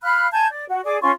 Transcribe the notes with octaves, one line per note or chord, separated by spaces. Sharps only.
F5 B5 F6 F#6
G#5 A5 G6 G#6
D5
F#4
G#4 D5 D6
C#4 F4 C6 C#6